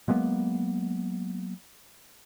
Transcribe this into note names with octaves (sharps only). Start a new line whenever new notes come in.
F#3 G#3 A#3 B3